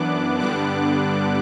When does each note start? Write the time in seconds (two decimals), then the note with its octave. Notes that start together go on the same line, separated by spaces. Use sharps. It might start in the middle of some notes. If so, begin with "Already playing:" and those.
Already playing: F#2 E3 B3 D4 D6 F#6
0.39 G2 D3 G3 B3 D4 D6 F#6